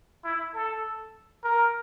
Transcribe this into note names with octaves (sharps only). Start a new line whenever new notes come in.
E4
A4
A#4